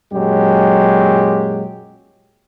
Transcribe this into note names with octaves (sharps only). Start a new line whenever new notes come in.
F#2 A#2 F#3 G#3 G4